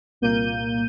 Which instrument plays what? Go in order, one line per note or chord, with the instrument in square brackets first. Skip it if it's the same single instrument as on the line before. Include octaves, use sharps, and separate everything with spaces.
[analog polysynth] C2 A#2 A#3 G6 D#7